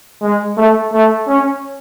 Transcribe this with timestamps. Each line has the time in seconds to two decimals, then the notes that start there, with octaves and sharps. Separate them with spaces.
0.22 G#3
0.57 A3
0.93 A3
1.28 C#4